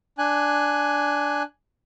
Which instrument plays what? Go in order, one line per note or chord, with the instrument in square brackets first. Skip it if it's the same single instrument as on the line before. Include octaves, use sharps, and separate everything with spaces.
[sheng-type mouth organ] D4 G#5 F#6